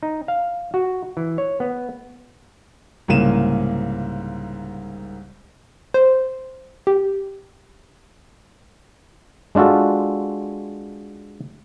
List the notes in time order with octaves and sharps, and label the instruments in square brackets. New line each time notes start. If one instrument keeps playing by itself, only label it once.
[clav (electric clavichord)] D#4
F5
F#4
E3
C#5
B3
[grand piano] C2 G#2 C#3 A#3 D#7 E7
[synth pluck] C5
G4
[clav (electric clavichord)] G#3 D4 F4 F#4 A4